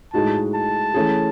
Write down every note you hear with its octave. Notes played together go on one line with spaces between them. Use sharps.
A2 G#3 D#4 F#4 A5
A5
E3 A3 C#4 G#4